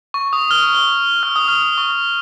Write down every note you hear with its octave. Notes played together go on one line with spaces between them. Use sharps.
C#6
D#6
F6
F6
D#6
F6
C#6